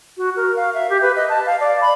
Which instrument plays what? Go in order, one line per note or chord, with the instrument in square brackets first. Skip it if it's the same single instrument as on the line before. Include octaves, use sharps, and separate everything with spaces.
[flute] F#4
A#4
F5
E5
G4
B4
D#5
A5
F5
D5
B5